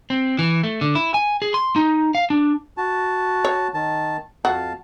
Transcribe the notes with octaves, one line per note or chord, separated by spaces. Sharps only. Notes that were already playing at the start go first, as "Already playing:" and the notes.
C4
E3
A3
D3
E4
G#5
G#4
C6
D#4
F5
D4
F#4 A5
C#5
D#3 A5
F2 F#4 F5 A5